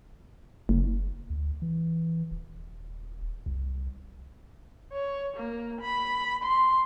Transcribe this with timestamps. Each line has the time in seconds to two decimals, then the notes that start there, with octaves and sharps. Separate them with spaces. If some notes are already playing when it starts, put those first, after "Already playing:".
0.69 F#1
1.30 D2
1.62 E3
2.31 D#1
3.46 C2
4.93 C#5
5.37 A#3
5.81 B5
6.44 C6